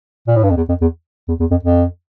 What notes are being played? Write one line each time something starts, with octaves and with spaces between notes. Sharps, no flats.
A#2
A2
G2
F2
E2
F2
E2
E2
E2
F2
F2